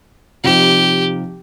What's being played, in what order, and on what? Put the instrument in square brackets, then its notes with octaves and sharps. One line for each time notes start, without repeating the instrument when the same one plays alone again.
[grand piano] C3 F3 D#4 [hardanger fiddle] G4